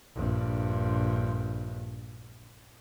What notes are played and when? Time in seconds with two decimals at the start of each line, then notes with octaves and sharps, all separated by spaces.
0.15 A#1 G2